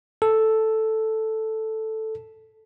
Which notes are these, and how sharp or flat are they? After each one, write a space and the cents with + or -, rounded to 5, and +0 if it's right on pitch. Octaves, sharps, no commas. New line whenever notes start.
A4 +0